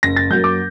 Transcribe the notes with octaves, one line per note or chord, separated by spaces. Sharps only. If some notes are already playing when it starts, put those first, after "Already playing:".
F#1 A#6
A6
F#2 F#3 A#3 G6
D6